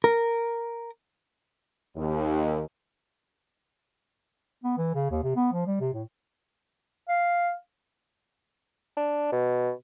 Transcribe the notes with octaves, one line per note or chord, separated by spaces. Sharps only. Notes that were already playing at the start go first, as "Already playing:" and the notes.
A#4
D#2
B3
E3
C#3
D#2
C3
B3
F3
G3
C3
A2
F5
D4
B2